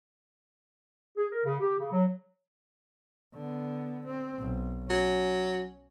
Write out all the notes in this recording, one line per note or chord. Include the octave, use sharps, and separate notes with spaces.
G#4
A#4
C#3
G4
C#3
F#3
D3 B3
C4
B1
F#3 C#4